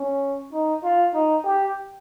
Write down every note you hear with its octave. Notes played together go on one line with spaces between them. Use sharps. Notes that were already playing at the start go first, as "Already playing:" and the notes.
Already playing: C#4
D#4
F4
D#4
G4